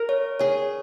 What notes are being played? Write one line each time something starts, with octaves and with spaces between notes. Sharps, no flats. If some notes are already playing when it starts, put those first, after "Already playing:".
Already playing: A#4
C#5
G#4 C#5